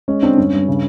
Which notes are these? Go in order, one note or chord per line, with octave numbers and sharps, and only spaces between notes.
G#3 C#4
D3 C4 D4
G2 C#4
G2
C#3